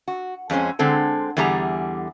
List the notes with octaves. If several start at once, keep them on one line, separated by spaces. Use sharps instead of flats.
F#4
F2 G#3 C#4 C5
D3 G#3 C4 A4
E2 D3 G3 G#4 G#5 A#5